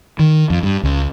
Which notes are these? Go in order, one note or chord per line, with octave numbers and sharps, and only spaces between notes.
D#3
F2
G2
C#2